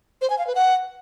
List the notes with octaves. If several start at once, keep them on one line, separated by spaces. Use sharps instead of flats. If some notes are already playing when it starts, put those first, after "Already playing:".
C5
G#5
F5
B4
F#5